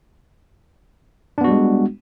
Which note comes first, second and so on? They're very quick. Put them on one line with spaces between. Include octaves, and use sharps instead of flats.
D4 B3 F#4 G3 G#3